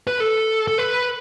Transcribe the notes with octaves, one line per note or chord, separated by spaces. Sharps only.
B4
A4
A4
B4